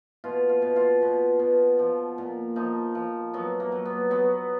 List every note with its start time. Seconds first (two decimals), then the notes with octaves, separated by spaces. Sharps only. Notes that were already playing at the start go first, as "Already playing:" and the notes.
0.24 B2 F4
0.49 F4
0.62 B2
0.76 F4
1.02 B2
1.39 B2
1.79 F3
2.18 A#2
2.56 F3 D#4
2.95 F3
3.34 F#3 B3
3.60 A#3
3.72 F#3
3.85 B3
4.11 F#3 B3